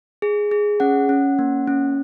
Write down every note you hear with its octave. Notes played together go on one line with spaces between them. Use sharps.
G#4
G#4
C#4 F#5
C#4
A#3
C#4